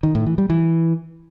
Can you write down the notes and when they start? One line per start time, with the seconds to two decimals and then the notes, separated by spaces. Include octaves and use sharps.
0.03 D#3
0.15 A2
0.26 E3
0.38 G3
0.50 E3